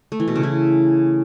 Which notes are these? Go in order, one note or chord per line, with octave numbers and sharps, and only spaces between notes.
A3
E3
B2
C#3
E4